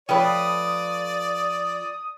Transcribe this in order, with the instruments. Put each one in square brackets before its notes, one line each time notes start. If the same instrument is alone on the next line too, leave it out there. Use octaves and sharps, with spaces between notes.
[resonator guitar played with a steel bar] F3 A3 B4 [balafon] C#5 G5 [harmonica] D5 [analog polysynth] D#6